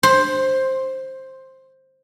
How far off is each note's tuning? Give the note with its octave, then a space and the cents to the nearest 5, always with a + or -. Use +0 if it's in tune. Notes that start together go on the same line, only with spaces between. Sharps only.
C5 +10